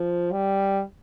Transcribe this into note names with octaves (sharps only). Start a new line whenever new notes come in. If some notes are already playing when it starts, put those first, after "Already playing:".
Already playing: F3
G3